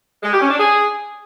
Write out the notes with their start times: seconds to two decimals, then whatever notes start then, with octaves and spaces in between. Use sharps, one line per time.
0.23 G#3
0.32 G4
0.41 C#4
0.50 D4
0.59 G#4